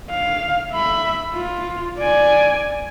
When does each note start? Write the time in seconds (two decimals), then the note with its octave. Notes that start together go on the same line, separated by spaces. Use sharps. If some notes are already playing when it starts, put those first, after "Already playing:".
0.10 F5
0.72 E5 B5
1.34 F4
2.00 D5 G#5